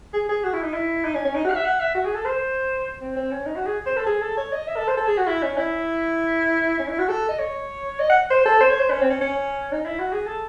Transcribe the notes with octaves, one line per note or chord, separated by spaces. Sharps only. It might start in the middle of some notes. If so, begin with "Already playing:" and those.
G#4
G#4
F#4
E4
D#4
E4
D#4
C#4
C#4
D#4
F#4
F#5
E5
F#5
E5
F#4
G#4
A4
C5
C4
C4
C#4
D#4
F#4
G#4
C5
A4
G#4
A4
C#5
D#5
E5
A4
C5
A4
G#4
F#4
E4
C#4
E4
C#4
E4
F#4
A4
D#5
C#5
D#5
F#5
C5
A4
C5
C#5
C5
C#4
C4
C#4
C#4
D#4
E4
F#4
G#4
A4